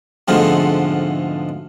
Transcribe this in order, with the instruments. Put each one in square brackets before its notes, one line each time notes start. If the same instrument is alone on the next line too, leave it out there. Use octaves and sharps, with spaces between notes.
[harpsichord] F2 G#2 B2 D3 F3 A3